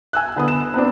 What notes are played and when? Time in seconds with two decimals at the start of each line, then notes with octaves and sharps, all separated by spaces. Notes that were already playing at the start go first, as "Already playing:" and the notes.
0.13 G#5 E6 F#6
0.36 D3 B3 D#6
0.48 E7
0.74 B3 C4 D4